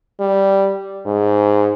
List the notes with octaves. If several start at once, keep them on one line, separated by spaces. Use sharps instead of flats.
G3
G#2